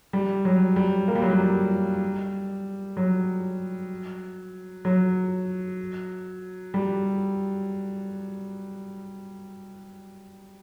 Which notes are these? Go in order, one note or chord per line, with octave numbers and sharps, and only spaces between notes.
G3
F#3
G3
A#3
G3
F#3
G3
F#3
F#3
G3